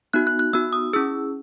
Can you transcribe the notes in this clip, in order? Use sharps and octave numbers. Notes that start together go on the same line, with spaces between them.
B3 D#4 F#4 F#6
F#6
F#6
B3 D#4 F#4 E6
D#6
C#4 E4 G#4 E6